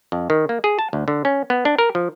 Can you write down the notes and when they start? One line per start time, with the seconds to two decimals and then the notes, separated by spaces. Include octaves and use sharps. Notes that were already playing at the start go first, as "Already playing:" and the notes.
0.12 F2
0.30 D#3
0.49 A#3
0.64 G#4
0.79 A5
0.93 D2
1.08 D3
1.25 C#4
1.50 B3
1.65 D4
1.79 A#4
1.95 F3